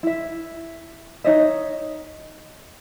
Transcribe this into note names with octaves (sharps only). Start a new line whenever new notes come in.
E4 E5
D#4 C#5 D#5 E5